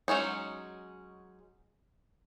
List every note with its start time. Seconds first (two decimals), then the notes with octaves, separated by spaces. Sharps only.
0.08 F#3 G#3 C#4 D#4